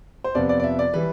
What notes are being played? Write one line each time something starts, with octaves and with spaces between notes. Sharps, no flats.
C5
F2 C3 F3 B3 D5
D5
D5
E5
D5
E3 G3 B4